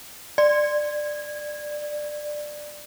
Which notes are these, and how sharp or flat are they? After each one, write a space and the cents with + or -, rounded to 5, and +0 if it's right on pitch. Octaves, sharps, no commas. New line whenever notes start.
D5 +15